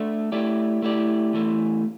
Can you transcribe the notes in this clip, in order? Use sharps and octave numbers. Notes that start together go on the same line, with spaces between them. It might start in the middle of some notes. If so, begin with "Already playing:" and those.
Already playing: A3 D4 A4 E5
A3 E4 G4 D5
A3 E4 G4 D5
E2 E3 A3